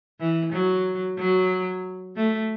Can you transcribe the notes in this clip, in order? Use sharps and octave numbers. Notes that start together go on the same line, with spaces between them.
E3
F#3
F#3
A3